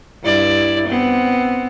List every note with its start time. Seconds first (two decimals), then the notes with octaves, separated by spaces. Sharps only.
0.24 G2 E4 D5
0.87 B3 C4